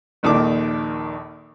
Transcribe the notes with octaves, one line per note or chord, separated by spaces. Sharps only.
A#1 D#2 D#3 A4 D5 D6